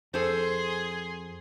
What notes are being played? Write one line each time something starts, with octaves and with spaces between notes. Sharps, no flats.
F2 G#4 A4 C5 C6